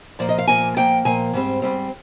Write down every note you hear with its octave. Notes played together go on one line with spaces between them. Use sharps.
A#2 F3 A#3 D5
D#5
F5
A#2 F3 A#3 G#5
A#2 F3 A#3 G5
A#2 F3 A#3 G#5
G#2 G3 C4
G#2 G3 C4